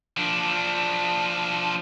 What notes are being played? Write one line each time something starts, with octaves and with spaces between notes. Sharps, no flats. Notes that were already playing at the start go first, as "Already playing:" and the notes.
F3 D4